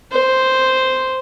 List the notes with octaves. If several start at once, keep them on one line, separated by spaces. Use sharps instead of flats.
C5